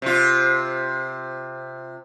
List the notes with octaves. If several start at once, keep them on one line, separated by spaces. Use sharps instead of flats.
C3 F4